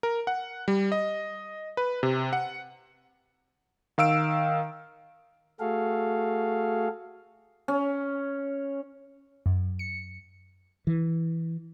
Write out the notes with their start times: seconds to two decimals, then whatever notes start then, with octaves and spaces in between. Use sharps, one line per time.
0.03 A#4
0.27 F#5
0.68 G3
0.92 D#5
1.77 B4
2.03 C3
2.33 F#5
3.98 D#3 F5 E6 D7
5.60 A3 F#4 G#4 A4 F5
7.68 C#4
9.46 F#2
9.79 C#7
10.87 E3